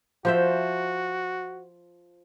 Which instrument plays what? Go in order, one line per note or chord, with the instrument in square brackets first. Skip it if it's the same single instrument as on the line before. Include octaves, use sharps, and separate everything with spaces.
[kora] F3 C5 E5 [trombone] F#4